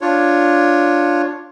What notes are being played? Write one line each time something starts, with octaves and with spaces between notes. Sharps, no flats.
D4 F4 C#5